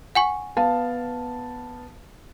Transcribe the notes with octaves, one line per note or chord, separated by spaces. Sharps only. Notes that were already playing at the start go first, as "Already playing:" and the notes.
F#5 G#5 C#6
B3 F5 A5